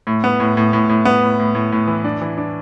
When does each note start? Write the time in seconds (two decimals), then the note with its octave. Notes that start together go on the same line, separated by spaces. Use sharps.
0.07 A2
0.24 B3
0.40 A2
0.57 A2
0.73 A2
0.89 A2
1.05 B3
1.23 A2
1.39 A2
1.55 A2
1.72 A2
1.87 E3
2.04 D4
2.22 E3
2.38 D4